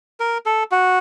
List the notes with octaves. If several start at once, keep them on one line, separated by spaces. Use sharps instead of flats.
A#4
A4
F#4